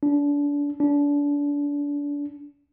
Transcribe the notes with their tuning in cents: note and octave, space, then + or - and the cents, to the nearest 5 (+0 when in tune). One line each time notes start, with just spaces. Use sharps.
D4 -30
D4 -30